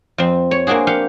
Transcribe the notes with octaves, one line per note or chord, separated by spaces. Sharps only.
F2 C4
C#5
A#3 C4 D4 F#4 G#4
G4 F5 F#5